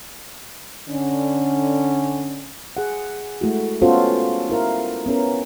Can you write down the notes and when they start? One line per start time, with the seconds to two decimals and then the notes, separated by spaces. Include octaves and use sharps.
0.89 D3 C#4
2.77 G#4 F#5
3.41 G#3 A3 E4 F#4
3.82 B3 C#4 F4 F#4 A4 C5
4.50 E4 A#4 F5
5.06 B3 C#4 A#4